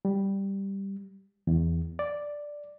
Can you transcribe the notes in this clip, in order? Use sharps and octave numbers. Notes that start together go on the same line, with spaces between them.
G3
E2
D5